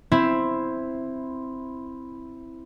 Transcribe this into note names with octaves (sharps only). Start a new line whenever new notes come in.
C4 E4